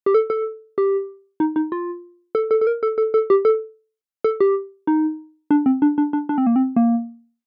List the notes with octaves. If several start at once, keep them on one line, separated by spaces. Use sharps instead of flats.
G4
A4
A4
G4
D#4
D#4
F4
A4
A4
A4
A#4
A4
A4
A4
G4
A4
A4
G4
D#4
D4
C4
D4
D4
D4
D4
C4
A#3
C4
A#3